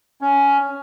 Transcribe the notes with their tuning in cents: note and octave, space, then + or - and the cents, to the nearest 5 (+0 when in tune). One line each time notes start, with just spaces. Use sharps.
C#4 +10